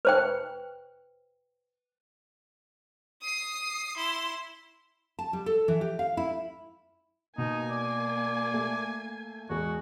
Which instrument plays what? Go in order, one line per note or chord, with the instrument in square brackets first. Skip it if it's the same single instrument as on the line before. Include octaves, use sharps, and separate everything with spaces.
[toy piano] B4 C5 G5
[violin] D#6 C7
E4 C6
[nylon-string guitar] A5
G3
A4
E3
G4
F5
E4
[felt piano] B2 [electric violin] A#3 G#5 [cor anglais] D#4
[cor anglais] D5
[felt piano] A3
[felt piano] E2 G#3 [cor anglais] F#4